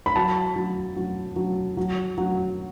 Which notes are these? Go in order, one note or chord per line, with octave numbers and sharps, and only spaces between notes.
B5
F#3 A5
F#3
F#3
F#3
F#3
F#3